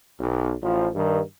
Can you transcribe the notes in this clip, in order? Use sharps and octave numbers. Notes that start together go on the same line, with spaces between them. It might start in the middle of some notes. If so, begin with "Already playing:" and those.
B1
A1 F3
G2 D#3